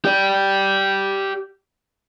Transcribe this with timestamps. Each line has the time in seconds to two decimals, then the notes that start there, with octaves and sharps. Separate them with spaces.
0.05 G4 D5